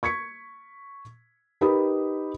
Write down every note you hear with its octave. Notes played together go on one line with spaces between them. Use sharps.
C#6 G#6 B6 C#7
D#4 G4 A#4 B4 B5 D#6